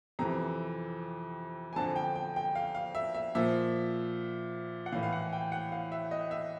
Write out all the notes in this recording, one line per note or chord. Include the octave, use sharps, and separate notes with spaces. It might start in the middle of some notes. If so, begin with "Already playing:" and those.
F2 C3 E3 A#5
G#5
F2 D3 F3 A5
G5
G5
G5
F5
F5
E5
E5
A#2 F3 E5
F#5
A2 E3 F5
F5
F#5
G5
F#5
F5
E5
D#5
E5